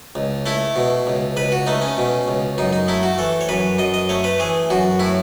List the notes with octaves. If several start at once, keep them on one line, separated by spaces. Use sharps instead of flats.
C#2
A3 E4
B2
C#2
C#2 B4
F#4
A3 D#4
C#4
B2
C#2
F#2 D#4
D#4
A3 E4
F#4
E3 A4
C#5
F#2 B4
F#2 D#5
D#5
A3 C#5
B4
E3 G#4
F#2 F#4
A2 E4